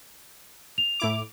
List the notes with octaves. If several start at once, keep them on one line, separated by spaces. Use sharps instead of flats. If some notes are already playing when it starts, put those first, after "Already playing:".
F7
A2 E4 D6